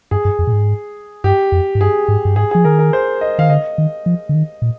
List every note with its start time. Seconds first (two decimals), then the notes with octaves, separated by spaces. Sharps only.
0.11 G2 G#4
0.25 G2
0.39 F2
0.47 A#2
0.53 G#2
1.24 G2 G4
1.52 F2
1.75 G#2
1.80 G2 G#4
2.08 G#2
2.25 G2
2.36 G#2 G#4
2.51 F3 G#4
2.64 D#3 A#4
2.79 A#4
2.93 C5
3.21 D#5
3.38 D#3 F5
3.49 D3 D#5
3.78 D#3
4.06 F3
4.29 D3
4.35 D#3
4.62 A#2